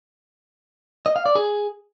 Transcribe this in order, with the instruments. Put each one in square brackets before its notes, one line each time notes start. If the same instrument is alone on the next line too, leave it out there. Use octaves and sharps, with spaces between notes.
[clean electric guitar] D#5
F5
D5
G#4